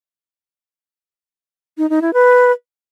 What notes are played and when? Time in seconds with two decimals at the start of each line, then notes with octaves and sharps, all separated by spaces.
1.78 D#4
1.90 D#4
2.02 E4
2.14 B4